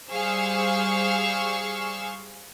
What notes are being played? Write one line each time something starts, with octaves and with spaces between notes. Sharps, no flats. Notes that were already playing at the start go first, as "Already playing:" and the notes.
G3 G#4 C5 F5 C#6 E6